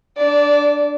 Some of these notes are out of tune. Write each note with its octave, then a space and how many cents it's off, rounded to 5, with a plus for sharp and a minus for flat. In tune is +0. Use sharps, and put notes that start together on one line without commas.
D4 +0 D5 -20